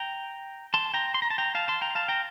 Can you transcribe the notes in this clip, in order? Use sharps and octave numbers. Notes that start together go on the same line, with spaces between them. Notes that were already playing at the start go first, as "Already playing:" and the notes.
Already playing: G5 A#5
A5 C6
G5 A#5
C6
A#5
A5
G5 A#5
F5 A5
A5 C6
G5 A#5
F5 A5
G5 A#5